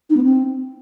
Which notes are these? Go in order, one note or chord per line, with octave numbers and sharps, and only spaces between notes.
D#4
B3
C4